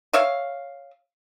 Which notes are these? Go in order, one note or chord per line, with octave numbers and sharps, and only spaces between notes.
C#5 E5 F5